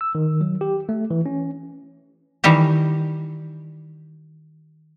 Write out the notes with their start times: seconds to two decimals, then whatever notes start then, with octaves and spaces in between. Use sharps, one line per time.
0.01 E6
0.15 D#3
0.41 F#3
0.61 G4
0.89 A3
1.11 E3
1.26 C#4
2.44 D#3 E3 G3 G4